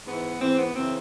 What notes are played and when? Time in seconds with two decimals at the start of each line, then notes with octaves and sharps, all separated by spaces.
0.06 G#2 E3 B3
0.40 G#2 E3 C4
0.58 B3
0.75 F#2 C#3 E3 C4